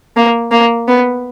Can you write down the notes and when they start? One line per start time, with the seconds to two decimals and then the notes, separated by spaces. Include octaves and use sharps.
0.17 A#3
0.52 A#3
0.88 B3